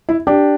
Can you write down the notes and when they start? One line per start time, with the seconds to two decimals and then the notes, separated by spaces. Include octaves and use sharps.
0.09 E4
0.27 D4 G4